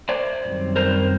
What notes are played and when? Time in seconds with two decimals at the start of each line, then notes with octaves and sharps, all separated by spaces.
0.09 C5 D5
0.42 F#2 D#3 G3 C4
0.76 A#4 C5